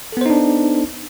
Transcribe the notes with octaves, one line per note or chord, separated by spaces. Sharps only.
B3 D4 D#4 A4 C5